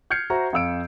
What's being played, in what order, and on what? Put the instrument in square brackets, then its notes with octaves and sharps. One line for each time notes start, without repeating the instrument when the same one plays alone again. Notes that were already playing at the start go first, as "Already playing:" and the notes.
[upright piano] F6 G6 G#6 C7 C#7
F#4 C5 E5 A#5
F2 F5 E6 D7